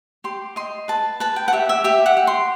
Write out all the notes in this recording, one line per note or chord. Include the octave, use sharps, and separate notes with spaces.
G4 C6
D#5 C6
B4 A5
B4 A5
G5
F#5
G4 E5
E5
G4 E5
F#5
G4
C6